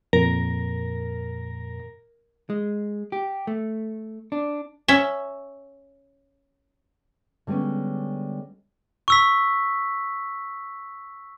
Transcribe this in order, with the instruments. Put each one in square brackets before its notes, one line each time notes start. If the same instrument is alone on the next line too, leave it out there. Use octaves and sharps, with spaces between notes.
[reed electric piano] F2 A#2 [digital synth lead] A#4
[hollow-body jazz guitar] G#3
G4
A3
D4
[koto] C#4 E5
[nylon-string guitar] D3 G3 G#3 B3 C#4
[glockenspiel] C#6 E6 B6